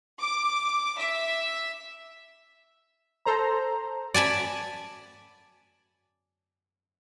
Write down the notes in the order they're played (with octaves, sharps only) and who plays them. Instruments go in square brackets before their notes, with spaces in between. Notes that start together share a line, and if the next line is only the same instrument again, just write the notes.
[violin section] D6
E5
[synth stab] A4 C5 A#5
[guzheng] D5 G#5 A5 B5